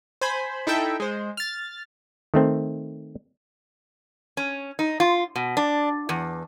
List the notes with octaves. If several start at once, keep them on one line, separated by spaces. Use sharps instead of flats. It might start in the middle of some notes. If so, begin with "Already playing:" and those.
C5 G#5 B5
D#4 E4 A4 E5 G5
G#3 C5
F6 A6
D#3 A3 C4
C#4
D#4
F4
B2
D4
E2